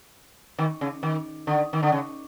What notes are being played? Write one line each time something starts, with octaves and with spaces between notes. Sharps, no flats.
D#3
C#3
D#3
D3
D#3
D3
C#3